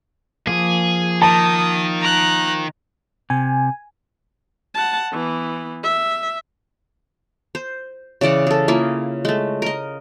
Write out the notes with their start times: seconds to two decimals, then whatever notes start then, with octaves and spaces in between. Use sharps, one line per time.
0.47 F3 A#3 G#4
1.22 D#3 A5 D#6
2.01 A#5 F#6
3.30 C3 G#5
4.74 F#5 A5
5.12 E3 B3
5.84 E5
7.55 C5
8.21 C#3 E3 D5 F#5
8.47 G#4 A4
8.68 A#3 E4 F4 G#4
9.25 G#3 A3
9.62 A#4 D#5